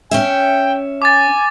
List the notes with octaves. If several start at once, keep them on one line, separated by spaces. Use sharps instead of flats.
C#4 C#5 E5 G5
G#5 D6 A6